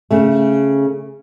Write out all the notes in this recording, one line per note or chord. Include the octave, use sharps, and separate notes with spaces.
C#3 A3